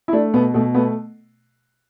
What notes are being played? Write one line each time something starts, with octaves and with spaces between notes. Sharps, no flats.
E4
A3 D4
B2 B3
B2 A3
A3 B3